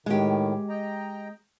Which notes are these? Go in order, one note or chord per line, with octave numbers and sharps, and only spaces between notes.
A2 D#3 G#3 G4
D#5 G5 A#5